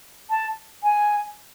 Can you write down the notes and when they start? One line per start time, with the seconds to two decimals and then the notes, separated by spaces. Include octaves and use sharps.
0.30 A5
0.83 G#5